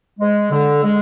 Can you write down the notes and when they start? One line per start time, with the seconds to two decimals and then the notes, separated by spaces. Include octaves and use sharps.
0.20 G#3
0.50 D3
0.83 G#3